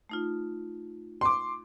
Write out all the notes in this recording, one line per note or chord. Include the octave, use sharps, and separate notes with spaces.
A3 D#4 F4
C6 D6